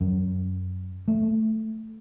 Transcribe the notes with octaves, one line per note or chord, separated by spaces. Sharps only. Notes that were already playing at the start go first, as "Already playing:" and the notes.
F#2
A3